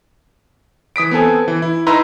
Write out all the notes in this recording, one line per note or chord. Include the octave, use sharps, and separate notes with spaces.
E3 D#6 B6 D7
B3 C4 A4 G#5
E3
E4
D#4 E4 B4 A#5 C6 E6